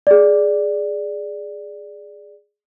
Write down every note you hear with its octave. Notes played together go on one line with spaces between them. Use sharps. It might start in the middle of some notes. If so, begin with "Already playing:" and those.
G#4 D5